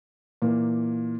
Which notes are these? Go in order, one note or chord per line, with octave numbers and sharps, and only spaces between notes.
A#2 E3 A#3